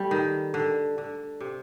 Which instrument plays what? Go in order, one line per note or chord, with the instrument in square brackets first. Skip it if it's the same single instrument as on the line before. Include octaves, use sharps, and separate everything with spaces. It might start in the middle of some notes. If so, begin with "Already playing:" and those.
Already playing: [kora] G3 A3
D#3
D3
D3
C3